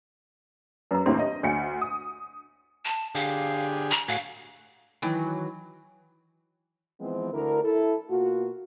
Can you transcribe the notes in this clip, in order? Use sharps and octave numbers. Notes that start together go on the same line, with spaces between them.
F#2 B4 A#5
D#2 A2 C4 D4 C6
D#5
D2 C#5 G#5 C#7
D#6
A5
D3 G4 G#4 F5
A#5
A2 F#4 F5 G#5
D#3 E3 F#3
E3 F3 G#3 B3 C4
D2 D3 E4 A#4
E4 A4
B2 A#3 F4 F#4